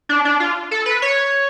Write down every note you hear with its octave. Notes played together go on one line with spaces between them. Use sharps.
D4
D4
F4
A4
B4
C#5